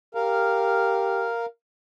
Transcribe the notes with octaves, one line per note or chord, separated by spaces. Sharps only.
G4 A#4 F5